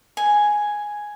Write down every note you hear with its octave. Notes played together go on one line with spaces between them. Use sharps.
G#5